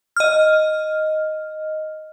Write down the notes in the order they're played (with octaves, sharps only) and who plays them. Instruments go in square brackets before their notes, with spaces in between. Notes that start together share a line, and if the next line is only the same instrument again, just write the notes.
[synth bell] D#5 F6